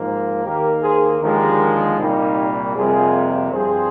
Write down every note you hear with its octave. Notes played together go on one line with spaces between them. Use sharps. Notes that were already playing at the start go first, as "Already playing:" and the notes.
Already playing: G#2 F3 A#3
D#2 D#3 A#3 G4 A#4
G#4 C5
D#2 D3 F3 G#3 G4 A#4
C2 A#2 G3 A#3 D#4 G4
F2 C3 G3 A#3 F4 G#4
G2 F3 C4 G#4 C5